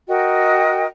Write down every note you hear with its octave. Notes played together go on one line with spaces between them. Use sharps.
F#4 A#4 D#5 G5